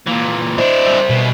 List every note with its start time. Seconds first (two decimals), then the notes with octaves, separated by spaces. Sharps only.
0.07 A#2 E3 A#3
0.58 D4 E4 C5
0.87 G3 E5
1.10 B2